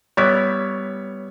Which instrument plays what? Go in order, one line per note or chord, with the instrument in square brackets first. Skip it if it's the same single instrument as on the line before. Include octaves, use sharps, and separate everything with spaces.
[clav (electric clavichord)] G3 B3 E4 [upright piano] C#5